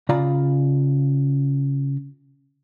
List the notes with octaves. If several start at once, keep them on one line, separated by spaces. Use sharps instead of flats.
C#3 F4 D5 F5 A#5 B5